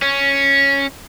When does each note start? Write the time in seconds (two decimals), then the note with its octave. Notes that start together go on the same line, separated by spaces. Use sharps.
0.02 C#4